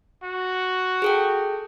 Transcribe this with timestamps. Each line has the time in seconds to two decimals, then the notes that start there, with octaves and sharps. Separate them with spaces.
0.23 F#4
1.02 G#4 A4 G5